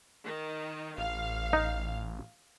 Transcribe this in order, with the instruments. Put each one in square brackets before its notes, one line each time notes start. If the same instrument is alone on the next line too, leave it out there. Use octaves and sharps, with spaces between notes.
[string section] D#3
[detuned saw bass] A1 [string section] F5
[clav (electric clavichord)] D#4